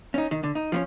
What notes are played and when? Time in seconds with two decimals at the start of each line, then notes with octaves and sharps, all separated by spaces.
0.14 C#4 D#4
0.31 D#3
0.43 D3
0.55 D#4
0.72 F3 B3 C#4